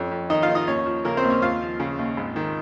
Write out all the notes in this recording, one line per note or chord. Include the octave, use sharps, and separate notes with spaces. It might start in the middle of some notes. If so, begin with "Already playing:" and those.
Already playing: F2 C#4
F2
D#3 D#4 D#5
F4 F5
D#3
D#4 D#5
D#2 C#4 C#5
F3
C#3 A#3 A#4
C4 C5
D#2
C#4 C#5
D#2 F4 F5
F3
C#3
D#2
G#1
D#3